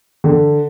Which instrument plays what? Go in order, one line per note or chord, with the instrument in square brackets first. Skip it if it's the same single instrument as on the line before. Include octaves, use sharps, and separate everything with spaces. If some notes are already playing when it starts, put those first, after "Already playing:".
[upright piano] D3